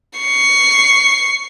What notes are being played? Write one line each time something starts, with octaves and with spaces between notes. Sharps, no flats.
C#6 C7